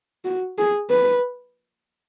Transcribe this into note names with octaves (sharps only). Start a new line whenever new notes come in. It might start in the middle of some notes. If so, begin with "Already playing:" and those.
F#4
G#4
B4